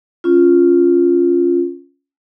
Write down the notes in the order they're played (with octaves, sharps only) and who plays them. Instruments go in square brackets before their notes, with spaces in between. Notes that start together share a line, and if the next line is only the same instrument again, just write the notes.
[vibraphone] C#4 F4